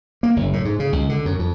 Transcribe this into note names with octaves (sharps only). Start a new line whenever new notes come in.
A#3
F#1
A2
G#2
C#3
C#2
D3
F#2
F2